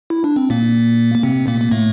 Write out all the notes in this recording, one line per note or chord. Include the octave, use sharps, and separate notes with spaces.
E4
D4
C4
A#2 A#3
A#3
C3 C4
A#2 A#3
A#3
A2 A3